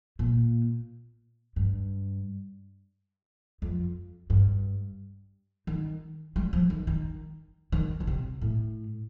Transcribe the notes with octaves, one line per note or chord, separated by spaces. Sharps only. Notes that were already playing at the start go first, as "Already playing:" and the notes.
A#2
G2
F2
G2
D#3
G3
F3
D#3
D#3
D#3
D3
C3
A2